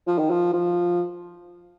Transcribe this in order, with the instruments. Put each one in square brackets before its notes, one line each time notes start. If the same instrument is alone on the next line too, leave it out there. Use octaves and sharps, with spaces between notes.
[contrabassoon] F3
D#3
F3
F3